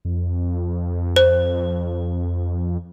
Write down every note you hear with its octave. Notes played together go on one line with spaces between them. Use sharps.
F2
C5